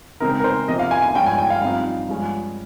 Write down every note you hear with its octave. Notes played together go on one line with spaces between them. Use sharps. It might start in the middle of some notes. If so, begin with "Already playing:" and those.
C#3 G#3 C4 D#4 A#4
A#4
C5
C3 F3 A#3 D#5
F5
G#5
G#5
G2 F3 G#3 C#4 G5
G#5
G5
F5
G2 F3 C4 D#4 F5
G2 F3 G#3 C#4